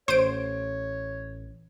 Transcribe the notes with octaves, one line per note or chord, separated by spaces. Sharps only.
A1 C5 C#5 D7